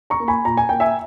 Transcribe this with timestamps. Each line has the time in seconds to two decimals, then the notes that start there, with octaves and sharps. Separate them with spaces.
0.10 A#5 C#6
0.20 A#3
0.28 G#5 B5
0.45 A#2 A#5
0.57 G#5
0.69 A#3 G5
0.80 E5 G#5